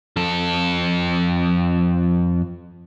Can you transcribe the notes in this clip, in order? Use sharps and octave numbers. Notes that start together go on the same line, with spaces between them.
F2 A4